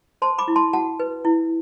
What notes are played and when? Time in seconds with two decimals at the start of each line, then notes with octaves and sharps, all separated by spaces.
0.22 C5 A5 C6
0.38 B5 D6
0.48 E4
0.56 A5 C6
0.73 F#4 F#5 A5
1.00 B4
1.25 E4